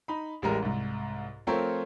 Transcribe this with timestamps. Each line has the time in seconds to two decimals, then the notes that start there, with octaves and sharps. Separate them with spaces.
0.08 D#4 B5
0.42 A1 G3 G#3 G4 A#4
0.62 C2 G#2
1.47 F3 A3 C4 F4 A#4 C#5